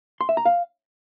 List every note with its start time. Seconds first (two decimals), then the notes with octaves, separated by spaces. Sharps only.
0.21 C6
0.29 E5
0.37 A#5
0.45 F5